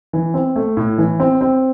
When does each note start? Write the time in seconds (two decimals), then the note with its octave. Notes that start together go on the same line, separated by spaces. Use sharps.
0.13 E3
0.34 C4
0.56 A3
0.77 A2
0.98 E3
1.20 C4
1.41 C4